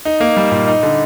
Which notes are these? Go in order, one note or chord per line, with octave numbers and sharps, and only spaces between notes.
D#4
A#3
G3
A#2
D#4
D3